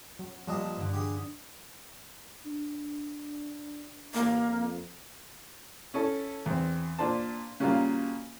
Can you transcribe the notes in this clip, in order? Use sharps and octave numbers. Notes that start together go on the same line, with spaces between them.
F#3
A#2 F3 G3 D4 D#5
G2 D3
G4 G#4
D4
A1 A#3
F2
C#4 E4 A4
E2 C4
A#2 D4 C5 A5
C#3 F#3 G3 A#3 F4